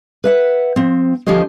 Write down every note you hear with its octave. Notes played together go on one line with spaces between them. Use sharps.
B4 E5 F#5
F3 C4
D2 F3 C#4 G4 C5 D#5